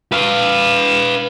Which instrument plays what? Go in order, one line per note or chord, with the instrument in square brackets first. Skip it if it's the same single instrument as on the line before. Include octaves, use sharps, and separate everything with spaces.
[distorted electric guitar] B4 F5